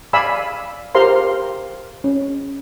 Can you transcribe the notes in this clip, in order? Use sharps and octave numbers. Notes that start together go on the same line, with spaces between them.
D5 F5 G#5 B5 E6
G4 A#4 C5 F5 A#5 C6
C#4